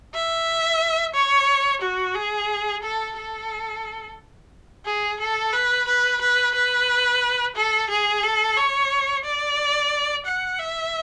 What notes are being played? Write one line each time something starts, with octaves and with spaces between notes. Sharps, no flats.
E5
C#5
F#4
G#4
A4
A4
G#4
A4
B4
B4
B4
B4
A4
G#4
A4
C#5
D5
F#5
E5